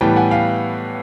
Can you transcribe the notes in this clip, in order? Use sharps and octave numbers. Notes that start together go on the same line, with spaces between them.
A2 E3 G3 B3 G5 A5
F#5 G#5
F5 G5